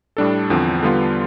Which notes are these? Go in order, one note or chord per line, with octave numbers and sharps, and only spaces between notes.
A2 G3 D4 A4
E2 D3 F3 C4
D3 G3 B3 F4